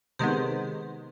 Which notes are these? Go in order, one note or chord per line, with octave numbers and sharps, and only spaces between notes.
C3 D#3 G#3 B3 C5